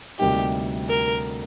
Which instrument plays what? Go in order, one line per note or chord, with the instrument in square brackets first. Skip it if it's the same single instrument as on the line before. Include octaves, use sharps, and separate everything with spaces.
[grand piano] D2 C3 G3 A#3 D#4 [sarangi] G4
[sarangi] A#4